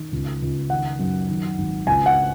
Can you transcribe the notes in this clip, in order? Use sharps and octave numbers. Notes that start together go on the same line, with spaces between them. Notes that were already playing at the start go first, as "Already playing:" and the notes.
Already playing: D#3
C#2
C#2
D#3 F#5
F#2
D#3
G#1
C#2 G#5
F#5